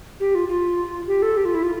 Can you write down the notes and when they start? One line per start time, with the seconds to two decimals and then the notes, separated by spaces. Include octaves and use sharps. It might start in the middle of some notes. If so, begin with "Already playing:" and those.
0.20 G4
0.35 F4
0.48 F4
1.07 G4
1.22 A4
1.37 G4
1.45 F4
1.55 E4
1.63 F4